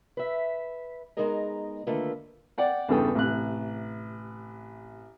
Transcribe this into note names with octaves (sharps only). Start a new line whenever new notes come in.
B4 E5
G#3 B3 D#4 G#4 A#4 D#5
D3 D#3 A3 A#3 F4 B4
D5 F#5 G5
E2 G2 C#3 A4 G5 D#6
A1 C3 F#6